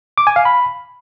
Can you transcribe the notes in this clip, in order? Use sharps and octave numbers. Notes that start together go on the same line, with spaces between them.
D6
G#5
F5
B5